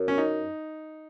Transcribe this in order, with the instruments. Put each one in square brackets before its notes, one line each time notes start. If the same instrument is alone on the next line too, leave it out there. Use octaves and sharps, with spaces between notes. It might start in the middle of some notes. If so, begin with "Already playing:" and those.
Already playing: [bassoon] F#2
[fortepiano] C#4
D#4